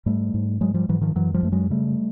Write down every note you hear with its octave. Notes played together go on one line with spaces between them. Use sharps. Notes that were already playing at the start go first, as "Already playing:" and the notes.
G#2 G3 A3
G#2
G#2 F#3 G#3
F3 G3
G#2 E3 F#3
D#3 F3
F#2 E3 F#3
F3 G3
F#2 A3
F#3 G#3
C#3 G3 A3